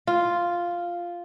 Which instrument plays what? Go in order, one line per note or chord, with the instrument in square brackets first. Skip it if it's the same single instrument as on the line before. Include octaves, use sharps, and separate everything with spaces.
[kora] F4